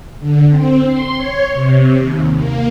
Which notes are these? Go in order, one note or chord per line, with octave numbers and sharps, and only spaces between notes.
D3
C4
C6
C#5
C3
D#2
A#3